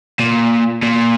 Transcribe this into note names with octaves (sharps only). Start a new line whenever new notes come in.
A#2
A#2